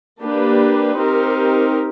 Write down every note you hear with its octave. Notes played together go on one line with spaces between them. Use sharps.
A#3 D4 G4 B4
C4 D#4 G4 A#4